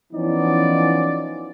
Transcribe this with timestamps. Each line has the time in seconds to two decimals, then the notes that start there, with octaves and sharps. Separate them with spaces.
0.13 E3 F3 B3 C#4 D#4 D5